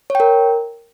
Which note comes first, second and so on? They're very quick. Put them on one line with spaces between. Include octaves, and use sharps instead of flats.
C#5 G5 A#4